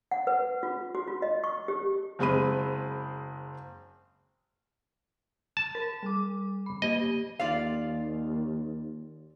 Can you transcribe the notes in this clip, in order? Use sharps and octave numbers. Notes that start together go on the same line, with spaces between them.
F#5
B4
F4
F#4
F4
D#5
C#6
G4
F#1 G#3 C4 B5 D#7
A5
A#4
G3 D6
B5
A#3 G4 D#5
D#2 F4 D5 F5